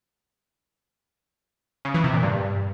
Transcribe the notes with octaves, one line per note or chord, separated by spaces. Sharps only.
C#3
E3
C3
A#2
G2